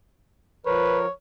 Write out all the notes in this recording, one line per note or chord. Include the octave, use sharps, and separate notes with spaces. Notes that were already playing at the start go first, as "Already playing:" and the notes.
F3 A#4 B4 C#5